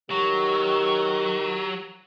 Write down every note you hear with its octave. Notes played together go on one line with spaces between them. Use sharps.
D#3 F#3 G4 C#6